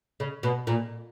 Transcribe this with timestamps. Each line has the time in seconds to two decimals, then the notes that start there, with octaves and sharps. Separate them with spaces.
0.20 C#3
0.43 B2
0.67 A#2